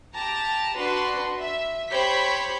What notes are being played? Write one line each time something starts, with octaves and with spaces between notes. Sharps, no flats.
G4 A5 A#5
D4 F#4 B4 C6
E5
G4 C5 C#5 B5 G6 B6